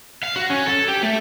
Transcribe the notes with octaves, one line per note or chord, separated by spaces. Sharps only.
F5
F#4
C#4
A4
G4
A3